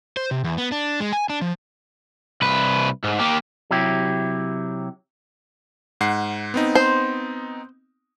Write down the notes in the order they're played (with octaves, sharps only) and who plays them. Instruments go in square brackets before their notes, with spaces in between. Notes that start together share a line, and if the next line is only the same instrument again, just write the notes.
[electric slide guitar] C5
C3
E2
B3
D4
G#3
G#5
D4
F3
[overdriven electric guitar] C2 B4
G#2
A#3 G4
[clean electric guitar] C3 F#3 E4 G4
[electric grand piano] G#2 F#5 C7
B3 C4 D#4
[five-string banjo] C5